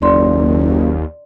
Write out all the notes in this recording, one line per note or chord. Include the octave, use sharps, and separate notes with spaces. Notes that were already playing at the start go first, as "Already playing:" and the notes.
F#1 D#2 D5 C6